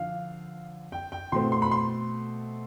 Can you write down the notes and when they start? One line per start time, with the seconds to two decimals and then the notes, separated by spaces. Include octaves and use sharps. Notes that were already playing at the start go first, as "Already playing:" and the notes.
Already playing: D3 F3 F5
0.92 G5
1.12 G5
1.32 B2 A3 C4 C6
1.52 C6
1.62 B5
1.71 C6